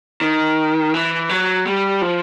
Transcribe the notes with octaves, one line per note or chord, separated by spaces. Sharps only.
D#3
E3
F#3
G3
F3